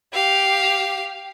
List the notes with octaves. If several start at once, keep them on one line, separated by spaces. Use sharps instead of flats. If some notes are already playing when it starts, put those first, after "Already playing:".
G4 F5